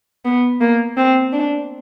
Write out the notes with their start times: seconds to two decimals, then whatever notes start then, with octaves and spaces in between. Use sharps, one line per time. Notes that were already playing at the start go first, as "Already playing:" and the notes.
0.25 B3
0.61 A#3
0.97 C4
1.33 D4